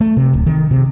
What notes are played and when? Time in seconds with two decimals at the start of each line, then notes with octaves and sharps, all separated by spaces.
0.01 A3
0.17 C3
0.33 D1
0.46 D#3
0.71 C3